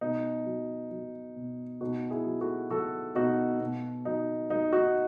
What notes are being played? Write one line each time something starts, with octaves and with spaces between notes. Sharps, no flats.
B2 D#4
F#3
F#3
B2
B2 D#4 F#4
E4 G#4
F#3
F#4 A4
F#3 F#4 A4
B2 D#4 F#4
B2
F#3 D#4
F#3 D#4
D#4 F#4